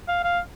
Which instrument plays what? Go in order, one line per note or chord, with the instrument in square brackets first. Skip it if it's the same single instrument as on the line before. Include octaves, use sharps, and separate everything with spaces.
[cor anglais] F5
F5